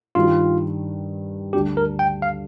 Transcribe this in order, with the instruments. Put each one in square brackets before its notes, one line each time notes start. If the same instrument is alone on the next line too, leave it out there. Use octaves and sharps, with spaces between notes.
[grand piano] G2 D#3 G3 [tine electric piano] F4
[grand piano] D2 D3 G3 D4 [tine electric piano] G4
[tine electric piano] A#4
G5
F5